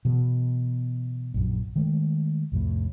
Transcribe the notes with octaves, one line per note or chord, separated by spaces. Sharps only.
B2 E3 B3
A#1 F#2
D#3 G#3 A3
C2 F2 A2 A3